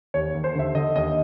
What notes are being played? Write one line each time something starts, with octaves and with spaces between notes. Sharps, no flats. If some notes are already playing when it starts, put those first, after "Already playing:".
D#2 C#5
D#2
C5
D3 E5
D3 D#5
D#2 D#5